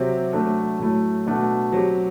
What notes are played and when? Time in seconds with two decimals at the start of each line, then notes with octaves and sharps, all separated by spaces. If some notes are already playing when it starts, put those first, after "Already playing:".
Already playing: C3 F#3 C4 G4
0.33 F#3 A3 D4 A4
0.79 A2 F#3 A3 E4
1.26 B2 A3 D4 F#4
1.72 F#3 C4 G4